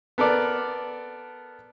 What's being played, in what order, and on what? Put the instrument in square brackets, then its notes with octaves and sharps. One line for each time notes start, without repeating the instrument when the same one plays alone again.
[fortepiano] B3 A4 A#4 D5